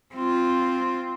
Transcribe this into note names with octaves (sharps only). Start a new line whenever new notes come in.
C4 F4